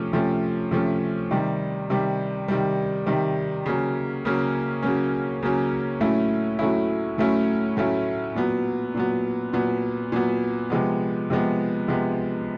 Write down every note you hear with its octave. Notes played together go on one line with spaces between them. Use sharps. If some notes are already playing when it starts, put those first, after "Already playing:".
Already playing: C3 F3 A3 C#4
C3 F3 A3 C#4
C3 F3 A3 C#4
C3 D#3 G3
C3 D#3 G3
C3 D#3 G3
C3 D#3 G3
C#3 F#3 A#3 C#4
C#3 F#3 A#3 C#4
C#3 F#3 A#3 C#4
C#3 F#3 A#3 C#4
A2 F#3 A3 C#4 E4
A2 F#3 A3 C#4 E4
A2 F#3 A3 C#4 E4
A2 F#3 A3 C#4 E4
A#2 F#3 B3
A#2 F#3 B3
A#2 F#3 B3
A#2 F#3 B3
C3 F3 G#3 B3
C3 F3 G#3 B3
C3 F3 G#3 B3